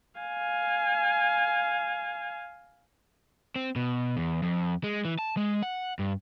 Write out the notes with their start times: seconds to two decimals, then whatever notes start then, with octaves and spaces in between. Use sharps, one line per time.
0.20 F5 G#5
3.56 C4
3.76 B2
4.17 E2
4.43 F2
4.84 G#3
5.05 E3
5.19 A5
5.37 G#3
5.63 F#5
5.99 G2